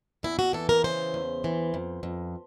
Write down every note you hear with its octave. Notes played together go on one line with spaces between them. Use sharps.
E2 E4
F#4
E3 A4
A#4
C#3 C5
E2
E3
F2
F2